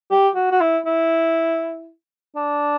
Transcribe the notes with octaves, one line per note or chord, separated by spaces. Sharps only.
G4
F#4
F#4
E4
E4
D4